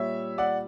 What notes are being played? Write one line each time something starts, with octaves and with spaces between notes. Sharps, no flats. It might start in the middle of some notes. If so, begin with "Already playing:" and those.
Already playing: A#2 G3 C#5 E5
D5 F#5